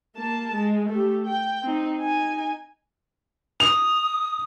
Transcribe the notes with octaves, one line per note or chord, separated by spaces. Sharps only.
A#3 A5
G#3
A3 G4
G5
C4 D#4
D#4 G#5
D#6 F7